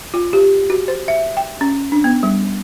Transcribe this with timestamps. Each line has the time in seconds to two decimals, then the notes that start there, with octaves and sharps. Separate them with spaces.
0.14 F4
0.33 G4
0.70 F#4
0.88 C5
1.08 E5
1.37 G5
1.61 C#4
1.92 D4
2.04 B3
2.23 G3